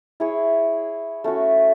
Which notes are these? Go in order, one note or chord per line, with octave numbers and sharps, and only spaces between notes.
E4 G#4 C#5
A3 C#4 F#4